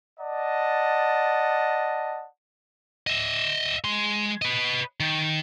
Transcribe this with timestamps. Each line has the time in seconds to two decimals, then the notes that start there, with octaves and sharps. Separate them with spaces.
0.19 D5 D#5 F#5 A5
3.07 D#5 E5
3.84 G#3 C6
4.42 B4 D#5
5.00 D#3